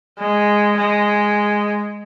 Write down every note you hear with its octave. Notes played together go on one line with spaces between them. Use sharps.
G#3
G#3